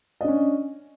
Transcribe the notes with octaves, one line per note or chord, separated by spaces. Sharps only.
C#4 D4 D#5